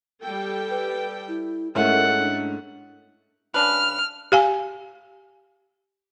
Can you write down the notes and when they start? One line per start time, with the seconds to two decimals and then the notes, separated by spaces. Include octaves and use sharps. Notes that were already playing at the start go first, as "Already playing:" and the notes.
0.22 G3 A4 G5
0.70 B4
1.28 E4
1.75 G#2 A3 C#4 E4 A#4 F#5
2.20 D4
3.54 C#3 D4 B4 F6
4.32 G4 F5 G#5